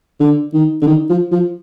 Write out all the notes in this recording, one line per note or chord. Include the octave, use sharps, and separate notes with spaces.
D3
D#3
D3
D#3
F3
F3